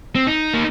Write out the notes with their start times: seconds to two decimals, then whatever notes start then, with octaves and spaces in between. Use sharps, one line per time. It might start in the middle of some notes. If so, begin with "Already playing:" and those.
0.15 C4
0.27 D#4
0.54 A#3